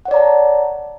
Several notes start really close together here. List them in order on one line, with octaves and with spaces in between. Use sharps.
F#5 C#5 D5 A#5 A5